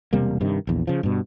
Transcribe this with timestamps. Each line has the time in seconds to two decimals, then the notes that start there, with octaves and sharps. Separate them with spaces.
0.13 E1 C3 G3 A#3
0.41 G2 C3 D#3
0.67 A#1 E2
0.87 C#3 F3
1.03 G2 B2